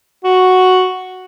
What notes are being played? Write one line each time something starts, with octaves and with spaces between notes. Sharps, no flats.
F#4